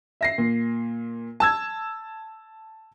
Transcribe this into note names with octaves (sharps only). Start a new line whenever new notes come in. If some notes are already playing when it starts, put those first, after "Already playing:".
E5 A#6 C7
A#2
A5 E6 G#6